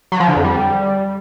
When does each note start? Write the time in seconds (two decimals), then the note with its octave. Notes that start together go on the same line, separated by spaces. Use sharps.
0.12 F#3
0.20 F3
0.28 D3
0.36 F2
0.44 G3